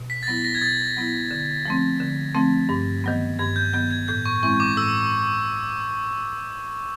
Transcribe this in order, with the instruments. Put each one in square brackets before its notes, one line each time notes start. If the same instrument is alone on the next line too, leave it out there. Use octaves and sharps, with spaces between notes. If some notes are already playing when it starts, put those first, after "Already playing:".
Already playing: [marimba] B2
[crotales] B6
A6
[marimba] F#3 B3 E4 [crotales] A#6
[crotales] A#6
G#6
[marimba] B2 [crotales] A6
[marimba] F#3 B3 E4
D3
F3 A3 C4
D3
F3 A3 C4
G2
D#3 F#3 B3
[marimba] G2 [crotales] G#6
[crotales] G6
[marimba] D#3 F#3 B3 [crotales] G6
[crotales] G#6
[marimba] A2 [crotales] G6
[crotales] C#6
[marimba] E3 G#3 C4 E4 [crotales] C#6
[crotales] D6
[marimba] A2 [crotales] E6